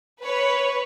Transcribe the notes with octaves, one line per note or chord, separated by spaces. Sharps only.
B4 C#5